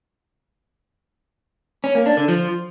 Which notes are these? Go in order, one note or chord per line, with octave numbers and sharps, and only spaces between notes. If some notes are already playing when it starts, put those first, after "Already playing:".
C#4
A#3
D4
D3
F3